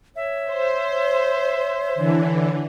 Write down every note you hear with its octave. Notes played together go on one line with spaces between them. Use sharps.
C#5 E5
C5
D3 E3